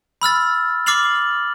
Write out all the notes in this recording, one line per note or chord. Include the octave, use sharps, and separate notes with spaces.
B5 E6 F6 A6
D6 F6 A6 C7 F7 F#7